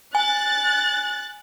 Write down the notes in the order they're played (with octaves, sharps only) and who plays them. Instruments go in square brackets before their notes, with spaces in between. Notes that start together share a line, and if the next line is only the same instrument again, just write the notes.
[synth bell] G#5 [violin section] F#6 A6